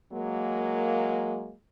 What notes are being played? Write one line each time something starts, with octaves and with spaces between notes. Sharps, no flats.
F#3 G#3 A#3